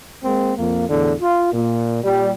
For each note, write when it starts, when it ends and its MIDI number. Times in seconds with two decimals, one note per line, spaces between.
0.24 0.52 56
0.24 0.52 58
0.24 0.52 60
0.57 0.85 41
0.57 0.85 58
0.88 1.12 40
0.88 1.12 45
0.88 1.12 50
1.20 1.48 65
1.52 2.00 46
2.03 2.31 46
2.03 2.31 55